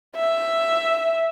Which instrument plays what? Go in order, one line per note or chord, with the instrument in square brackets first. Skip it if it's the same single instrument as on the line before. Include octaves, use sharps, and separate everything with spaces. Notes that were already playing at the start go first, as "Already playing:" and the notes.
[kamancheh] E5